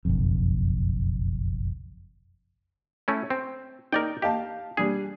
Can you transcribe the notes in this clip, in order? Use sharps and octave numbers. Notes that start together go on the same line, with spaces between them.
F#1 B1 F2
A3 C#4 E4
C4
D#4 A#4 D5 G5
G4 D#5 F5 A5
G3 D4 G#4